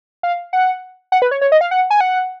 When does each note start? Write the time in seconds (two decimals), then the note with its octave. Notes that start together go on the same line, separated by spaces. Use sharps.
0.23 F5
0.53 F#5
1.12 F#5
1.22 B4
1.31 C#5
1.41 C#5
1.52 D#5
1.61 F5
1.71 F#5
1.91 G#5
2.01 F#5